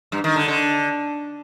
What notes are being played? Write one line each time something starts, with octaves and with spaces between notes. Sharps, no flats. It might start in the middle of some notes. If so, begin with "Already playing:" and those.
G2
D#3
D3
D3